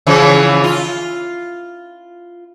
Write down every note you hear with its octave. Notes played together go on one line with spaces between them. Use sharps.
C#3 E3 F3
F4